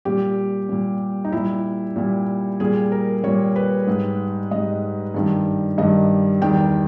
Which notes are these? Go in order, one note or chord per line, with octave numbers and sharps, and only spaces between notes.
A#2 G3 G4
A#2 G3
D#4
A#2 G3 E4
A#2 G3
A#2 G3 G#4
A#4
A#2 G3 C#5
B4
G#2 G3
G#2 G3 D#5
G2 D#3 G3
G2 D#3 G3 D#5
E2 D#3 G3 G5